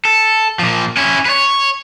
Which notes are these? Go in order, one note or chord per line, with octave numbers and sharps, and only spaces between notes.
A4
A#2 F3
C#4 E4
B4 C#5